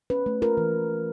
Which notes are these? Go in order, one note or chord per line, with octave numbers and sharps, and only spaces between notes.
C#4 B4
A3
F4 A#4
E3